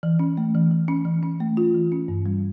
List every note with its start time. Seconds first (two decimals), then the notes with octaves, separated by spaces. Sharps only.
0.03 E3
0.19 C#4
0.37 A3
0.55 E3
0.71 E3
0.88 C#4
1.05 E3
1.23 C#4
1.40 A3
1.57 F4
1.75 E3
1.92 C#4
2.08 G2
2.26 G3